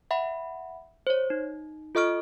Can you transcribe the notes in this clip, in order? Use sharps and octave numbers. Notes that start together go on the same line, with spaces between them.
E5 F#5 B5
C5 C#5
D#4
F4 A4 D#5 C#6 F6 D7